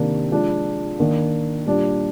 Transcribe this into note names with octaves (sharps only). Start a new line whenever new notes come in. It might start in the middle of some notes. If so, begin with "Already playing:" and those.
Already playing: C3 D#3 A#3 D4
F3 G#3 D4
D#3 A#3 D4
A#2 G3 D4